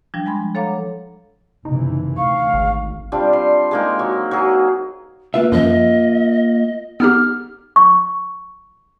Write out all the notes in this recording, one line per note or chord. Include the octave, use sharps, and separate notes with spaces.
F3 G3 D4
G#3 G#5 B5 C6
A4 C#5 F5 F#5 A#5 D6
F#1 C3 E3 D#4
D2 F5 C#6
G#1
G3 C4 D4 F4
C6
G#3 A#3 D#4
F#3
F#3 G#4
A#3 F4 B4 E5
F#2 F3 D#5
B3 D#4 G4 F6
C#6